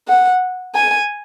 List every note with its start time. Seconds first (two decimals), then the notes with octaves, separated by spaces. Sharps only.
0.08 F#5
0.75 G#5